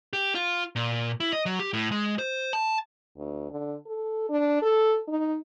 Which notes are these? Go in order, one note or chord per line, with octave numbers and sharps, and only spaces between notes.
G4
F4
A#2
E4
D#5
F#3
G4
A2
G#3
C5
A5
D2
D3
A4
D4
A4
D#4